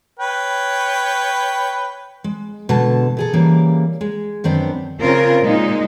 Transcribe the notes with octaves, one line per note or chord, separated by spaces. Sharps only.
B4 C#5 G5
G#3
B2 D3 G#3 A5
A#2 G#4 A4
C#3 E3 G3 A#3
G#3
F#2 D#3 B3 C4 D4
C#3 C4 F4 A#4
A#2 G#3 D#4